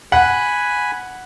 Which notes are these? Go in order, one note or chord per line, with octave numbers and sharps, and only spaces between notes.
F#5 G#5 B5